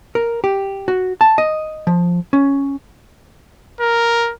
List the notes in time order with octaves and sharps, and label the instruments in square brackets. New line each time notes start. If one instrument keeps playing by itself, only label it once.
[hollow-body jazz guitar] A#4
G4
F#4
A5
D#5
F3
C#4
[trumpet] A#4